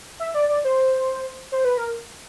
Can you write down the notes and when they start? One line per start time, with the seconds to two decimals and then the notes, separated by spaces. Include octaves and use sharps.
0.20 E5
0.34 D5
0.49 D5
0.65 C5
1.52 C5
1.65 B4
1.77 A#4